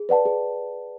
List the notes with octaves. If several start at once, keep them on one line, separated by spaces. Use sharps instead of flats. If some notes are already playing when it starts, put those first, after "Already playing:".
Already playing: G#4
B4 D5 F#5 A5
G#4